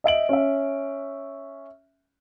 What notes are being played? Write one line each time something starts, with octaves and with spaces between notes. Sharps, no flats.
D#5 E5 D7 F#7
C#4 E5